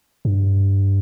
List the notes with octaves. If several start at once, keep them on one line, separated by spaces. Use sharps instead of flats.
G2